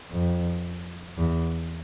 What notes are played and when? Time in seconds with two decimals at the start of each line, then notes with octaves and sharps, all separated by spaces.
0.11 F2
1.18 E2